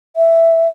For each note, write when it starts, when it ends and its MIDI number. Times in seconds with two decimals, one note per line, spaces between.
0.16 0.68 76